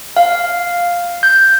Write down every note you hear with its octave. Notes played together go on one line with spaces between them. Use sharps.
F5
G6